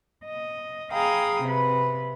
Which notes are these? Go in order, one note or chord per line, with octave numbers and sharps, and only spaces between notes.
D#5
G#4 F5 G5 A#5 B5 D#6
C3 B4